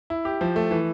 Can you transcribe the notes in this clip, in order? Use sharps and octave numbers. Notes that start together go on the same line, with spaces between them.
E4
G4
F3
A3
E3